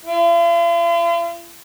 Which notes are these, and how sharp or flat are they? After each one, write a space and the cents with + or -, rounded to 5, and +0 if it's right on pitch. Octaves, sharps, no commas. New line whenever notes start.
F4 -45